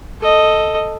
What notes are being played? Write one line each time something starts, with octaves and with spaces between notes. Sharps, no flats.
A4 D#5